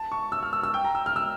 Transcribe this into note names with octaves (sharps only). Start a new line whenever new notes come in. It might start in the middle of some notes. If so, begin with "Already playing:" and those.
Already playing: A5
C#6
E6
F6
E6
E6
G5
A#5
E6
F6
E6